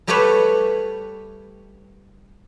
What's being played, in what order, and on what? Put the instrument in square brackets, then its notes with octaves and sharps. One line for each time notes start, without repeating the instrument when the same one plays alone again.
[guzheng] G3 A3 G4 A4 B4 C#5